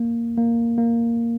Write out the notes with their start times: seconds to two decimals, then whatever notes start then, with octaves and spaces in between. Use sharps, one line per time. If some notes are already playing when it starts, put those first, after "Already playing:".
Already playing: A#3
0.37 A#3
0.78 A#3